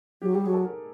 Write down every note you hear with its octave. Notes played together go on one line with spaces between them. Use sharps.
F#3 G4
G3 G4
F#3 G#4
A4
A#4